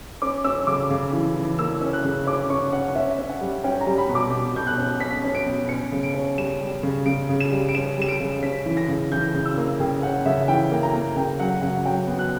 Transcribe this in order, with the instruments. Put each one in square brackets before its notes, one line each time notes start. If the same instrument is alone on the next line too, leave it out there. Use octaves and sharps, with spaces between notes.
[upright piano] C#4 D6
C#4 E6
C#3 D6
C#3
E3
E3
A#3 E6
C#4
F#6
C#3
C#4 D6
C#4 C#6
C#4 F#5
C#4 E5
C#4
F#5
G3
C#4 G5
A#5
G3
B5
B2
D6
B2
B2 G6
F#6
C#4
C#4 B6
C#4
D7
B2
C#4 C#7
C#3
D7
C#4
G3 E7
G3
C#3
C#3 D7
C#3
E7
G3
D7
C#4 E7
G3 E7
D7
C#3
C#4 B6
E3
A#6
C#3
E3 G6
C#3
E6
A#3
C#3 G5
C#4 F#5
C#3 E5
E3 G5
A#3
A#5
A#3
C#3 G5
F#3 F#5
C#3 F#5
F#3 G5
B3
F#6